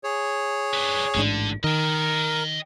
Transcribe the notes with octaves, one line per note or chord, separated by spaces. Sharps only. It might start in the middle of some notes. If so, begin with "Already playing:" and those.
G#4 C#5
D4 B4
A1 G#2 D3 D4
D#3 A#4 D#5 G5